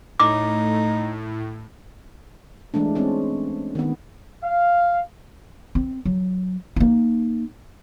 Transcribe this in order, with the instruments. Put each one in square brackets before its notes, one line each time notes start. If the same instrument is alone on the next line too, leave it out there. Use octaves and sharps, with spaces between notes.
[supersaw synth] A2 [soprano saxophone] D#4 [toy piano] D6
[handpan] E3 G#3 A3 D4
G#3 C4 C#4
D#3 B3
[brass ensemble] F5
[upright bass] C4
F#3
A#3 D#4